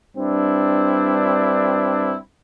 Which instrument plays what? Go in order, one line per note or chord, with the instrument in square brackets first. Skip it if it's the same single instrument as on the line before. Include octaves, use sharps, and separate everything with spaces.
[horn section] G2 C4 D4 E4